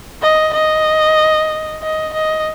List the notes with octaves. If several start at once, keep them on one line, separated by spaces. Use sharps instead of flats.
D#5
D#5
D#5
D#5